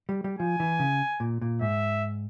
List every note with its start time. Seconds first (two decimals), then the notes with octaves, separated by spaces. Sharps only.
0.09 G3
0.24 G3
0.39 F3 G#5
0.60 E3
0.79 C#3
1.20 A#2
1.41 A#2
1.61 G#2 E5